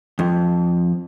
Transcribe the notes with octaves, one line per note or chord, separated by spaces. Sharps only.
F2